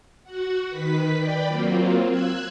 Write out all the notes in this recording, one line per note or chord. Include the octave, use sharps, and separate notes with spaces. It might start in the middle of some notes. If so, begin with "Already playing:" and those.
F#4 F#5
D#3 B4 B6
D5 G5 B5
F#3 A#3 C4 F4
E6 F#6 G#6